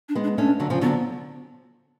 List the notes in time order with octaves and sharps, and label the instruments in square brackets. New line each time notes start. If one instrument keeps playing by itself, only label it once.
[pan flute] D4
[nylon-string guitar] G#3 B3
[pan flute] D4
[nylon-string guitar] A3 C#4 [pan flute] D4
[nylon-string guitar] D3 F#3
C#3 F3
[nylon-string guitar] D3 F#3 [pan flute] B3